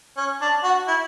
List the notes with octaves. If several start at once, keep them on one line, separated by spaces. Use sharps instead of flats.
C#4
D4
F#4
E4